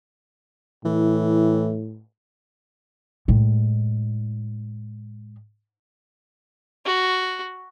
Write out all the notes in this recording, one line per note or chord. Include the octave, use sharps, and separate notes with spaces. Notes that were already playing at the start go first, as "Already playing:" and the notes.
A2 E3
A2 G#3
F#4